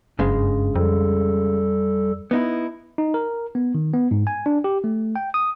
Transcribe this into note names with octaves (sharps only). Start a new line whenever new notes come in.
F#1 G2 C#3 G#3
F2 G3 A4
B3 D#4 E4
D#4
A#4
B3
D#3
B3
G#2
G#5
D4
G4
A3
G5
D#6